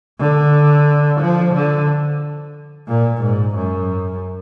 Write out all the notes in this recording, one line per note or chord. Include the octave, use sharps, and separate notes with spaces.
D3
F3
D3
A#2
G#2
F#2